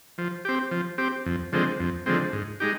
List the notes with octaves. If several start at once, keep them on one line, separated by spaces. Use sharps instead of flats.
F3
C4 G4
F3
C4 G4
F2
D3 F3 G#3 C4
F2
D3 F3 G#3 C4
G#2
G#3 D#4 G4